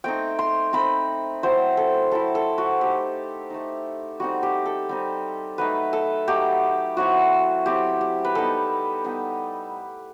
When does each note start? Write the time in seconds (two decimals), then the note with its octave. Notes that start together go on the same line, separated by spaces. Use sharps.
0.04 A3 C4 D#4 G5
0.39 C6
0.73 A3 C4 D#4 B5
1.43 F#3 C4 E4 C5
1.77 A4
2.11 F#3 C4 E4 A4
2.35 A4
2.58 F#4
2.81 A3 D#4 G4
3.50 A3 D#4
4.20 G3 C4 D#4 F#4
4.43 G4
4.66 A4
4.89 G3 C4 D#4
5.58 F#3 A3 D#4 B4
5.93 A4
6.27 F#3 A3 D#4 G4
6.97 F#3 C4 E4 F#4
7.66 F#3 C4 E4 G4
8.01 G4
8.25 B4
8.35 G3 B3 D#4 A4
9.04 G3 B3 D#4